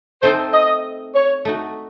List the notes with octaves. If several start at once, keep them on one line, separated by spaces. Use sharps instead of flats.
A3 C4 D#4 A4 C5
D#5
C#5
A3 D#4 F#4